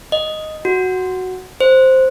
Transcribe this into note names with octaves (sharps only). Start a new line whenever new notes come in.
D#5
F#4
C5